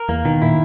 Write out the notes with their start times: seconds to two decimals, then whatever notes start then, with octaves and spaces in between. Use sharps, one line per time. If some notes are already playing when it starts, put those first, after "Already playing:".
Already playing: A#4
0.09 E2 A#3
0.25 B2 D#3
0.42 A#2 E4